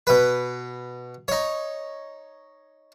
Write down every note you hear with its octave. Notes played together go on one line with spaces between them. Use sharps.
B2 B4
D#4 C#5